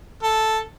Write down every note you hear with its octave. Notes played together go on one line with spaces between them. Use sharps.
A4